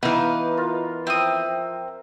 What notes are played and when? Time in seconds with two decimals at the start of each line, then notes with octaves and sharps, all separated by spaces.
0.03 E3 B3 D#4 B4 F5
0.57 F4 A#4
1.07 F3 C4 E5 D#6